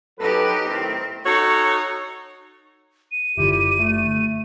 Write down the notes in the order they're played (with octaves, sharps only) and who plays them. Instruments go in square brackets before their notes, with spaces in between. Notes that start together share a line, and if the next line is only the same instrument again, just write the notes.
[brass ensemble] F#3 A4 B4 [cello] D#4 G4
[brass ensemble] A2 D#3 [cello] C4
[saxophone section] D#4 F#4 A4 C#5
[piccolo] D#7
[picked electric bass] F#1 D3 [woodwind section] E4 F4 G4
[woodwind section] A3